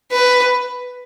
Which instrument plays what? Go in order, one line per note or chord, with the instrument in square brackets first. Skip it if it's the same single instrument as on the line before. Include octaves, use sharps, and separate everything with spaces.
[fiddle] B4